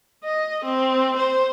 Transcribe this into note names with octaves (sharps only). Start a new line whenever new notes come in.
D#5
C4
C5